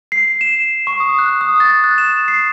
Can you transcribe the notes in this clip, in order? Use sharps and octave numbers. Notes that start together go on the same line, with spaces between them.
C7
E7
C#6
D#6
F#6
D#6
A6
F#6
E7
C7